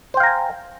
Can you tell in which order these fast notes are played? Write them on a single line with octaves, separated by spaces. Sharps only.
C5 G5 F5 A#5 G#5